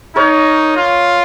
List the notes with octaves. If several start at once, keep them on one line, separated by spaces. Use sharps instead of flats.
D#4 A#4 C#5
F4